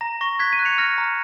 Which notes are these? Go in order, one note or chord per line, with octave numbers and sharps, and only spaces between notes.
A#5 A#6
C#6 A#6
F#6 G#6 B6
B6 D#7
F#6
C#7 F7
F6 A#6 C#7
A#5